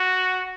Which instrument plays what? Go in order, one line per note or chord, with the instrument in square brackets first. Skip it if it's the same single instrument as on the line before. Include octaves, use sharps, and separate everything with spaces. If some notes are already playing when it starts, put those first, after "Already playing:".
Already playing: [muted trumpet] F#4